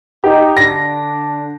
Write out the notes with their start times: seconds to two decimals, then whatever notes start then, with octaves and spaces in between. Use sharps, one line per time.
0.24 D#4 G4
0.57 D3 D4 A#6